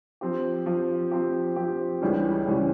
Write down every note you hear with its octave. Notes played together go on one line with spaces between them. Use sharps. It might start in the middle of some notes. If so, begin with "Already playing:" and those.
F3 C4 G4
F3 C4 G4
F3 C4 G4
F3 C4 G4
C#2 C#3 E3 G3 C#4
C#2 C#3 E3 G3 C#4